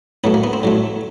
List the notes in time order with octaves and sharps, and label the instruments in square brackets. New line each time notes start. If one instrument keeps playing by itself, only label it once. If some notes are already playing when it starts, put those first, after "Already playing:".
[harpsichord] A2 F#3 A3 B3
A#3
B3
C4
A2 F#3 A3